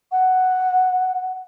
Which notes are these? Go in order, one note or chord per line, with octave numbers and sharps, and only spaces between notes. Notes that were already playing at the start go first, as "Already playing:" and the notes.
F#5